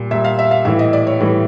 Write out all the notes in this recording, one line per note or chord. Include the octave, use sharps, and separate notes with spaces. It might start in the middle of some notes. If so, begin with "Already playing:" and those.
Already playing: A#2 G3
A#2 G3 E5
F5
E5
F5
A2 E3 G3 E5
D#5
D5
C#5
A2 E3 G3